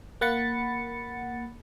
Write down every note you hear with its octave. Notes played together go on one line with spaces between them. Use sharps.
A#3 F#5 B5 A6 C#7